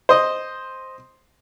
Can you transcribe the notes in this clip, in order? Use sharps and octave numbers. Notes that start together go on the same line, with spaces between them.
C5 D#5